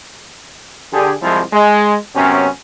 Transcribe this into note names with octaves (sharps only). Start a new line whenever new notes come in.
D3 G4 G#4
C2 F3 G#3 C4 E4 F4
G#3
F#2 C3 B3 C#4